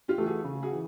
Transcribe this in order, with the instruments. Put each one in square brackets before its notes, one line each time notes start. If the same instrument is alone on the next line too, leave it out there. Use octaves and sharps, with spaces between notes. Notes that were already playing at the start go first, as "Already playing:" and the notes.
[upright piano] F4 G4
[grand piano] E3 A3
[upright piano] F#4 G#4
[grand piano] C#3
[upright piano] F#4 G#4
[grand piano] E3